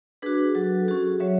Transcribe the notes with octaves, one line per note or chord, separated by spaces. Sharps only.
D4 F#4 G#4 B4
F#3 F#4 A4
C#4 F#4 G#4
F#3 C#5 E5